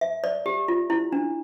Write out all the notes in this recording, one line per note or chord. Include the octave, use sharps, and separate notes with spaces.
E5
D5
G4
F4
E4
D4